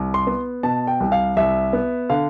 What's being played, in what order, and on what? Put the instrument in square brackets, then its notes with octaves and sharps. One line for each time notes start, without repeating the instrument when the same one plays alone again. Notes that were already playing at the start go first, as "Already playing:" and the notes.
Already playing: [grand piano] C2
C6
B3
B2 A5
G5
C2
F5
C2 E5
B3
D3 F5